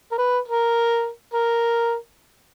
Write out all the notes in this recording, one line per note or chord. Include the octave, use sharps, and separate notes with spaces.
A#4
B4
A#4
A#4